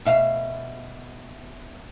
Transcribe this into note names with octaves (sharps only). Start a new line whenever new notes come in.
B2 E5 F5